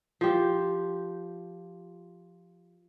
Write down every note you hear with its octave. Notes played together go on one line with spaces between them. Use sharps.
F3 G4